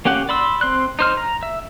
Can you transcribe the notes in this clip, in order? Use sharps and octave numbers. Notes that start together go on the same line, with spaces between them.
A#3 C#4 G4 F#5
D5 B5 C6 E6
C4 C6 F#6
D#4 C5 F6
A#5
E5